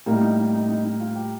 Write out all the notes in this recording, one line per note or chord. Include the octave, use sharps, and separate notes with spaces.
A2 G3 A#3 D#4
D#4
D#4
D#4
D#4
D#4
F4
G4